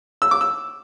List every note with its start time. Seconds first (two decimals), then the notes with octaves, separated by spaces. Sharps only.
0.22 E6
0.31 D6
0.41 E6